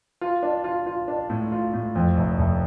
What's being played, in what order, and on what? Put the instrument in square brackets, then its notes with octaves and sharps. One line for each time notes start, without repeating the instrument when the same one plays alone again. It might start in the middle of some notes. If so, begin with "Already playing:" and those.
[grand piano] F4
D4
F4
F4
D4
A2
F4
A2
F2
F1
F1